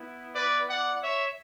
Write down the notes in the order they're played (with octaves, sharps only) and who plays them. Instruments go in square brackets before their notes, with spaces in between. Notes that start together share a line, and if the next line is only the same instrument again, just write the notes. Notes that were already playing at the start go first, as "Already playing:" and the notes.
Already playing: [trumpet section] B3 E4
B4 D5
D5 F#5
C#5 E5